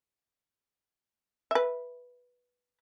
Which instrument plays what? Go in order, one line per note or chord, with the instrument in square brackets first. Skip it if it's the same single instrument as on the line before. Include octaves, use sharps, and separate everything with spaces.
[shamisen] B4 E5